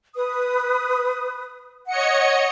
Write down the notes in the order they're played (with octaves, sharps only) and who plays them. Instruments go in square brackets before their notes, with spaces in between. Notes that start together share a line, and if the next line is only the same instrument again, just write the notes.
[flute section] B4 D#6
[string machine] C#5 D#5 C#7 [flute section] F#5